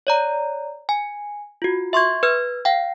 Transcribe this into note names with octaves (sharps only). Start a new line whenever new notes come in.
C#5 D5 A#5
G#5
F4 F#4
E5 C6 C#6 G#6
B4 F6 G#6
F5 G5